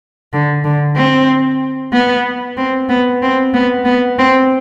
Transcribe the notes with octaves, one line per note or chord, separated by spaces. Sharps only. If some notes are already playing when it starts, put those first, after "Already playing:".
D3
D3
C4
B3
C4
B3
C4
B3
B3
C4